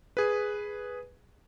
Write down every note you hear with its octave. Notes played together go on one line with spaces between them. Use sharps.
G#4 B4